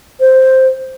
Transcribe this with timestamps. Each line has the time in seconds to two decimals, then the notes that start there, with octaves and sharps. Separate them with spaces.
0.20 C5